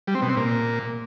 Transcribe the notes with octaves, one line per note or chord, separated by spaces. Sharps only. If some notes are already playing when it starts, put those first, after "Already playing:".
G3
C4
B2
C4
A#2